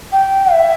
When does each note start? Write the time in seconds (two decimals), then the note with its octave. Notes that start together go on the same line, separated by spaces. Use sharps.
0.12 G5
0.53 E5